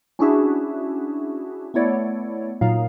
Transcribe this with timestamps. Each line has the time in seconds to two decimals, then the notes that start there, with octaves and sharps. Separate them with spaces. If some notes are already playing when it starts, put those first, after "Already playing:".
0.19 C#4 D4 E4 F#4 G#4 E5
1.74 A3 B3 E4 C#5 D5
2.61 A#2 F#3 D#4 F5